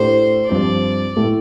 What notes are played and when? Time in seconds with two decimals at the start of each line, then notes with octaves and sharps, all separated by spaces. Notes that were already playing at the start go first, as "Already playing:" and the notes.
Already playing: A2 A3 D4 G4 C5
0.49 G2 F3 C4 D5
1.17 A2 A3